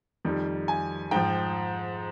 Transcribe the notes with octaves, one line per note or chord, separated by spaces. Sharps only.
F2 D#3 G3
G#5
G#2 F3 G5